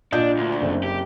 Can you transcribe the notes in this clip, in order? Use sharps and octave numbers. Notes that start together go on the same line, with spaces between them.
A#2 D4 D#5 G6
D2
F#1 C4
G4